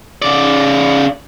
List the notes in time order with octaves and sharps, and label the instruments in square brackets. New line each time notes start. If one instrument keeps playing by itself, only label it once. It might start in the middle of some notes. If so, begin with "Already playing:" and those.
[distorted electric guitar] C#3 D5